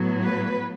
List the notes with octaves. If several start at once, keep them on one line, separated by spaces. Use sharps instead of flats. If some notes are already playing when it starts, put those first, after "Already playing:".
Already playing: A2 F#3 B3
B4